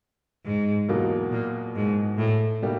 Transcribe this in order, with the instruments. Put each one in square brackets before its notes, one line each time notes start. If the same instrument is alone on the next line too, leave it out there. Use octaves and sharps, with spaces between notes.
[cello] G#2
[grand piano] E2 B2 F#3 A#3
[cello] A#2
G#2
A2
[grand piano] B2 G3 A#3 D#4